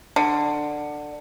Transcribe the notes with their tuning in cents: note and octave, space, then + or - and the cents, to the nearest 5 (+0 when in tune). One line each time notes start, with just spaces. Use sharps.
D3 +15